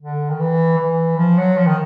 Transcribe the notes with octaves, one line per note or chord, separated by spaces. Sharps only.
D3
D#3
E3
E3
F3
F#3
F3
D#3